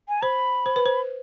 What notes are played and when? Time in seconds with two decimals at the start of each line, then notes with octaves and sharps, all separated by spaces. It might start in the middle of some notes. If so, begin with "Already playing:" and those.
0.09 G#5
0.23 C5 B5
0.66 C5
0.76 B4
0.86 C5